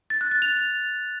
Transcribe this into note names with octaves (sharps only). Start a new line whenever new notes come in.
A6
F#6
A6
F7